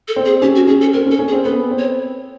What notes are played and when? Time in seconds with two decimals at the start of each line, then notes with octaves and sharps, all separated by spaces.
0.08 A4
0.16 C4
0.26 G#4
0.42 C#4 G4
0.55 F#4
0.67 C#4 G#4
0.81 A4
0.94 C4 A#4
1.06 C#4
1.11 A4
1.19 C#4
1.28 G#4
1.32 C4
1.45 B3 A4
1.71 C4
1.79 C#5